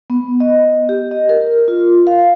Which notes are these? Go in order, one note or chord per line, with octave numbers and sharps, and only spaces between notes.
B3
D#5
G4
D#5
A#4
F4
F5